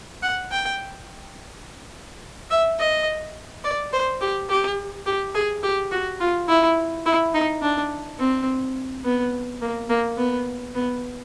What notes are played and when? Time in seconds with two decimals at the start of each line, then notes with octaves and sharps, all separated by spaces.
0.22 F#5
0.51 G5
2.51 E5
2.79 D#5
3.64 D5
3.93 C5
4.21 G4
4.49 G4
5.06 G4
5.35 G#4
5.63 G4
5.92 F#4
6.20 F4
6.48 E4
7.06 E4
7.34 D#4
7.62 D4
8.19 C4
9.04 B3
9.61 A#3
9.89 A#3
10.18 B3
10.75 B3